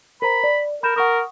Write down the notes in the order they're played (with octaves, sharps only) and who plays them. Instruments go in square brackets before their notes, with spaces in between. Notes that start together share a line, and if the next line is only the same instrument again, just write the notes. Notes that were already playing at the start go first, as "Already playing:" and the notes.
[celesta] A#4 C5 A#5 [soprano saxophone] B5
[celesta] D5
[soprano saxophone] A#4 [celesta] B5 G6 E7
[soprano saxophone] A#4 [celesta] F#5 C#6 D#6